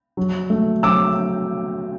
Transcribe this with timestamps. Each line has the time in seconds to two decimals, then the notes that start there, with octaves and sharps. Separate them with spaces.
0.17 F#3
0.50 A3
0.83 F#3 D6 E6